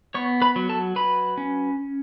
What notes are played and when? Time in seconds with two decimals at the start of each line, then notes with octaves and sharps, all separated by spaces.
0.14 B3 C#5 C#6
0.42 B4 B5
0.56 F#3
0.69 A4 A5
0.96 F#3 B4 B5
1.38 C#4